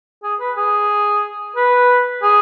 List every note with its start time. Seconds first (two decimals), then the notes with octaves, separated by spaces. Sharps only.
0.23 G#4
0.40 B4
0.57 G#4
1.56 B4
2.23 G#4